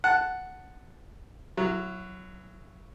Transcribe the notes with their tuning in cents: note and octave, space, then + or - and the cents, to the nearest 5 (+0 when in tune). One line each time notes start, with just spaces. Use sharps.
F#5 +0 A5 +0
F#3 +0 E4 +30